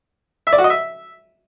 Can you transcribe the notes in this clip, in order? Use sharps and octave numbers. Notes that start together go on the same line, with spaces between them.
E5
D5
F#4
D#5
E5